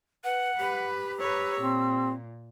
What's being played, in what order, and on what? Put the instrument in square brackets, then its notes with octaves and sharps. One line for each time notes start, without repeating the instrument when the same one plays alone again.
[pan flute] B4 [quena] F#5
[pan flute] G4 [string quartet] B4 B5
[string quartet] B4 C#5 A#5 [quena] E6
[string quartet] A#2 [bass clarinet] C4